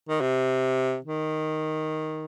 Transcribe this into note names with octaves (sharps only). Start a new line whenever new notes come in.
D#3
C3
D#3